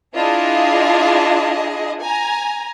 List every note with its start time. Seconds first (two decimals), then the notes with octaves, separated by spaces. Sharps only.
0.15 D4 E4 F4 G#4 D#5
2.00 G#5 A#5